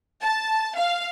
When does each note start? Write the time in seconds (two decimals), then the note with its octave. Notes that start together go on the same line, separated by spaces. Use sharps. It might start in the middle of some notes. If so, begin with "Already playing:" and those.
0.23 A5
0.77 F5